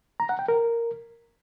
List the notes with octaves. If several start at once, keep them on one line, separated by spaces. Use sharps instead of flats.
A#5
F#5
G5
A#4